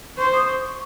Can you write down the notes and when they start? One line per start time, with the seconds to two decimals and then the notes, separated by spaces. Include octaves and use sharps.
0.17 C5 C#6
0.33 D#6
0.48 C#6
0.63 C#6